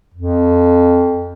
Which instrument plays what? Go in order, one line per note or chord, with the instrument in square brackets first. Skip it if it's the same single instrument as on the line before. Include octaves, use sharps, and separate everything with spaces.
[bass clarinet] F2